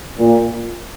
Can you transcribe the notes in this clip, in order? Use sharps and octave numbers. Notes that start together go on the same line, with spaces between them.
A#2